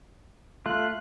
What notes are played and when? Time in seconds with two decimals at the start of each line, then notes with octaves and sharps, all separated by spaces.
0.66 A3 F4 F#6